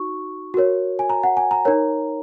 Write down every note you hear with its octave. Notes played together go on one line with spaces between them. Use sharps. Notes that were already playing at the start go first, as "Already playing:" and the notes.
Already playing: D#4 F#4 C#6
F#4 A#4 C#5
G#5
A#5
F#5
G#5
A#5
D#4 A#4 C#5